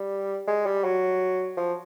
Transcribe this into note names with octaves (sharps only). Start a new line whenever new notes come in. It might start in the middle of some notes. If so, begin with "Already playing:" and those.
Already playing: G3
G#3
G3
F#3
F3